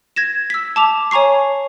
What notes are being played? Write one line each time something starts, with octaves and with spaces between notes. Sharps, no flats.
G#6 A#6 E7
E6 B6
A5 D6 F7
C#5 G#5 A#5 C#6 C7